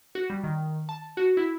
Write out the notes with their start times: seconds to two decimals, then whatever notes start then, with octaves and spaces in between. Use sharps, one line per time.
0.15 F#4
0.30 G3
0.44 D#3
0.89 A5
1.17 F#4
1.37 E4